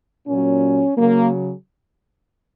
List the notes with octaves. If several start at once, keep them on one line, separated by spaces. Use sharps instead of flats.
A#2 F#3 C#4
C#3 F#3 A#3